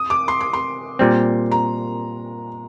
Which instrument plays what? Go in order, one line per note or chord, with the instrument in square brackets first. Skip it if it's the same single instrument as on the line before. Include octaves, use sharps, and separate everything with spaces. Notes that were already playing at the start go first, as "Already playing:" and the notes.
Already playing: [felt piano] D#6
D6
C6
D6
C6
[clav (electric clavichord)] A#2 G3 C4
[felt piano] A#5